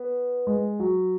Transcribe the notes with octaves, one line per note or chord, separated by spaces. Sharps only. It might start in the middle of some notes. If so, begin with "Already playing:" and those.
Already playing: B3
G#3
F#3